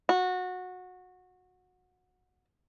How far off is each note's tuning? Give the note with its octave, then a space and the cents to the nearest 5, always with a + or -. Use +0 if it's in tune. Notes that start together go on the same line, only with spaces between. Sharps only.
F#4 -20